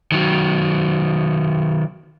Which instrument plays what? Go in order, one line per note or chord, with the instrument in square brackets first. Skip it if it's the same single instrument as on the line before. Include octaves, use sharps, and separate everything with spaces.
[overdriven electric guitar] D#3 F#3